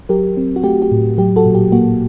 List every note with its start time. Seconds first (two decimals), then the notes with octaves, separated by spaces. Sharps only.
0.09 F#3 G4 A#4
0.37 C4
0.56 F#4
0.64 A3 G4
0.82 G4
0.92 A2
1.18 F#3 G4
1.36 F#4 A4
1.46 A#2
1.55 G4
1.72 A#3 F#4